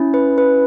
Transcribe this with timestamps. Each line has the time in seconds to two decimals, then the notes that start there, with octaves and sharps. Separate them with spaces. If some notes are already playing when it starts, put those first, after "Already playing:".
Already playing: C#4 E4
0.14 B4
0.38 B4